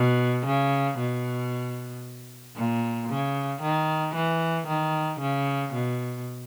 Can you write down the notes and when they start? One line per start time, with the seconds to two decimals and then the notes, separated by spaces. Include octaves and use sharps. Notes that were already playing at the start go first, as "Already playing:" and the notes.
Already playing: B2
0.46 C#3
0.98 B2
2.56 A#2
3.09 C#3
3.62 D#3
4.15 E3
4.67 D#3
5.20 C#3
5.73 B2